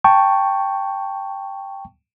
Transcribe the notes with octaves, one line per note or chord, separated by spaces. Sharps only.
G5 A5 C#6